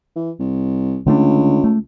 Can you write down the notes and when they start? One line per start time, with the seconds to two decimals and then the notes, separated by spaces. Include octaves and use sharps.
0.16 E3
0.40 C2
1.06 C#2 D3 A3 D4
1.64 A3